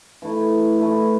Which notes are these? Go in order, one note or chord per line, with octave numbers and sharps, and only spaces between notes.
E3 A3 E4
E3 A3 E4